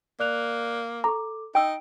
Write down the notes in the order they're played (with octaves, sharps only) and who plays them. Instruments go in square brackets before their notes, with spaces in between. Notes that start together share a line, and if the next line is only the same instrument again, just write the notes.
[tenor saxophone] A#3 [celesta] D5 F#6 F7
[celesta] A4 D6 [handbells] A#5 C#6
[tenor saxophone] D#4 [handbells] G5 E6 [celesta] D7